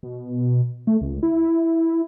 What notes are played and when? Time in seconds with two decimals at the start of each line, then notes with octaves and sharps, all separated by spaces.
0.03 B2
0.87 A3
1.01 C#2
1.23 E4